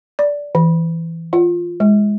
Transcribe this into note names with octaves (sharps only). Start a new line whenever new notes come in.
D5
E3
F4
G#3